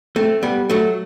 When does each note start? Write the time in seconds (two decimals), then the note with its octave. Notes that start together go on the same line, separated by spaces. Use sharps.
0.16 A3 C4
0.43 G3 B3
0.70 F#3 A3